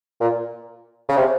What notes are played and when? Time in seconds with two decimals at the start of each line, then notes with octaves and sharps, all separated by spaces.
0.20 A#2
1.09 C#3
1.16 C3